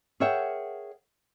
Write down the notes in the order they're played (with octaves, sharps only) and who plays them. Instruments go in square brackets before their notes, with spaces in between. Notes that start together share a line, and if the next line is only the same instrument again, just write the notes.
[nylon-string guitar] G#4 A#4 C#5 E5 F#5 G5